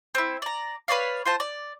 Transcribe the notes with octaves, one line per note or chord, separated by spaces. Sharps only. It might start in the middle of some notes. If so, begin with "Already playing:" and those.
C4 E4
D5 A#5
B4 C#5 D5 F5
F4 C5 A5
D5